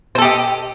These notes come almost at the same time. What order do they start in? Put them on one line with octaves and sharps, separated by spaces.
C5 A4 G4 D#5